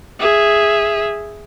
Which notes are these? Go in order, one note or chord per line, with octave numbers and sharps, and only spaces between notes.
G#4 E5